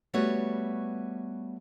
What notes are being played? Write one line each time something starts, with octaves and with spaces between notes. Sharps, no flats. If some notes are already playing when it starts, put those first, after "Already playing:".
G3 A3 B3 F#4 B4 C#5